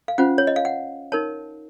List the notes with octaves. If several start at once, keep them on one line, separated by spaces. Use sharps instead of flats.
F5
C#4 F4 C5 F#5
C#5
D#5
F5
F#5
D#4 A#4 C#5 A5